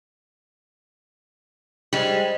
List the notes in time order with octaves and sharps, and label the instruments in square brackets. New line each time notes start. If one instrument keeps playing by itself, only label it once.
[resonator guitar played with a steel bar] G3 G#3 [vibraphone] C5 D#5